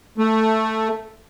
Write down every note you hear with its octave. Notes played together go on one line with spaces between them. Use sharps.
A3